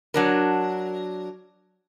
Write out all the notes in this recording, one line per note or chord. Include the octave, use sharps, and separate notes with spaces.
F#3 D4 A#4